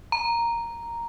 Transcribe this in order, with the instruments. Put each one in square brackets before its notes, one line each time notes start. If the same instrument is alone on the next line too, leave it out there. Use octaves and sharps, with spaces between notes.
[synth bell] A#5